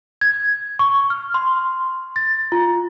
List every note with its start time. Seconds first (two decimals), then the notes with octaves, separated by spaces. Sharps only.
0.21 G#6
0.79 C#6
1.10 F6
1.34 C6
2.16 A6
2.52 F4